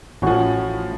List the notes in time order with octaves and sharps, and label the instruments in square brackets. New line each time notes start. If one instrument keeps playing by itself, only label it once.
[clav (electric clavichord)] A1 C#4 F#4 [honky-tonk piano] A2 F3